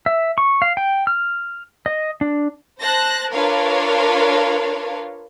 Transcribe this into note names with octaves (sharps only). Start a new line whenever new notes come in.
E5
C#6
F5
G5
F6
D#5
D4
C5 A5 F#6 A#6
D4 F4 A#4 B4 C#5 F5